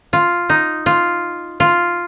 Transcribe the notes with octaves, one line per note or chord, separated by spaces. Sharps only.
F4
D#4
F4
F4